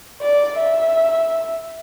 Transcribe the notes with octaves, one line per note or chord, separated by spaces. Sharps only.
D5
E5